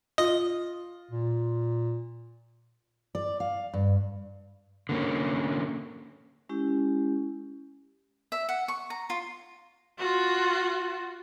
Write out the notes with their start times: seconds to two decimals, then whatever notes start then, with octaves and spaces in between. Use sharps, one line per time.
0.18 F4 D#5
1.11 A#2
3.15 D5
3.40 F5
3.74 G2
4.89 D3 A#3 C#4
6.49 G#3 C#4 E4 G4
8.32 E5
8.49 F#5
8.68 C#6
8.90 A#5
9.10 F4
9.98 F4 F#4